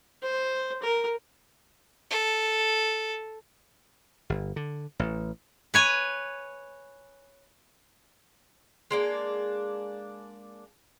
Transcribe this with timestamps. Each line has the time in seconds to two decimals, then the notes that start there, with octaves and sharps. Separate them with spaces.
0.23 C5
0.82 A#4
2.10 A4
4.30 G1
4.56 D3
4.99 A1
5.74 B4 C#5 G#5
8.91 G#3 A#3 D4